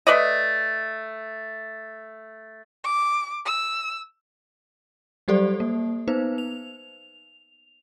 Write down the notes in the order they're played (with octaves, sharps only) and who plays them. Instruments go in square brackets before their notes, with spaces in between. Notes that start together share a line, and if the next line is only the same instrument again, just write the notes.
[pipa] A3 B4 D5 D#5
[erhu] D6
E6
[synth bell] F#3 G3 G4 A4 C5 D5
A#3
B3 D#4 B4 C5
F7